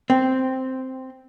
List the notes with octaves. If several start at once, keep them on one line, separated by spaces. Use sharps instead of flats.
C4